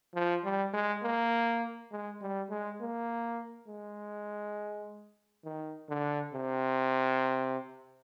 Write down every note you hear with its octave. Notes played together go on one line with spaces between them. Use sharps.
F3
G3
G#3
A#3
G#3
G3
G#3
A#3
G#3
D#3
D3
C3